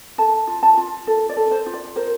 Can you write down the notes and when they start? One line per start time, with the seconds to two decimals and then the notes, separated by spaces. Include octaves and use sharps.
0.18 A4 A5
0.47 F4
0.63 A5
0.77 F4
1.07 A4
1.29 D5
1.37 A4
1.51 C5
1.66 F4
1.74 D5
1.96 A#4 C5